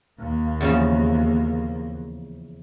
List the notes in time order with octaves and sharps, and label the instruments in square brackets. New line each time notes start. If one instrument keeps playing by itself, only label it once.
[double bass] D#2 A#3
[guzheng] E2 C#3 F3